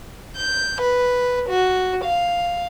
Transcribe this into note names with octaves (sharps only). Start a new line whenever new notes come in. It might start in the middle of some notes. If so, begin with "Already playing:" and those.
G6
B4
F#4
F5